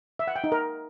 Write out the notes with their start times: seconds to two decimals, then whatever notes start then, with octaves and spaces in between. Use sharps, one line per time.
0.19 E5
0.28 F#5
0.36 G5
0.44 D#4
0.52 A#4